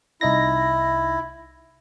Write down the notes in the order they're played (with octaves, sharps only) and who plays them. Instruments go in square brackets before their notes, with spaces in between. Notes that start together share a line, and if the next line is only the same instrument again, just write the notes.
[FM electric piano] C2 D#4 A#6 [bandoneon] E4